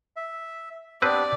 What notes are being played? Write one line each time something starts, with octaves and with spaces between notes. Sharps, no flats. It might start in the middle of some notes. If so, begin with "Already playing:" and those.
E5
B3 C4 D4 G4 B4 D5